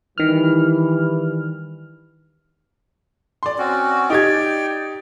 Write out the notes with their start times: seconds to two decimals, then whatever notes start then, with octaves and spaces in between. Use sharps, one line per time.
0.18 D#3 E3 G3 F6
3.43 D5 C6
3.58 C4 C#4 F#4
4.10 D#4 G4 D5 G5 G#6